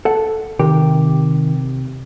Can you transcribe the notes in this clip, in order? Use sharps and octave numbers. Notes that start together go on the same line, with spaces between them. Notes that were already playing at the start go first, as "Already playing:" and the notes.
A4 F#5
C3 D#3 G4